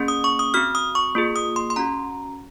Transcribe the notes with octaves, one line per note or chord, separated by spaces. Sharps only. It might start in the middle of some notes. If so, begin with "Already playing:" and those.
Already playing: A#3 C#4 G#4
D#6
C#6
D#6
C4 F#4 F6
D#6
C#6
A#3 F4 G#4
D#6
C6
C6
C#4 F#4 A#5